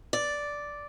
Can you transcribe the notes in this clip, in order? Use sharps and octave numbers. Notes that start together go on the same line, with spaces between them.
D5